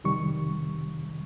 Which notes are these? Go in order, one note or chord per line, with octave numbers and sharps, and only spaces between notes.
F2 C3 D#3 G3 C#6